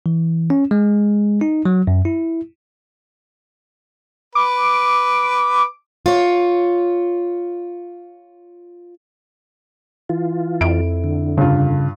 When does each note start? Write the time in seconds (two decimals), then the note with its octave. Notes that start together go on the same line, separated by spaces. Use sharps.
0.06 E3
0.50 C#4
0.71 G#3
1.41 D#4
1.65 F#3
1.87 F#2
2.05 E4
4.35 B4 D6
6.06 F4 C#5
10.09 E3 F4
10.61 F2 E4 D7
11.04 D3
11.37 G2 C#3 F4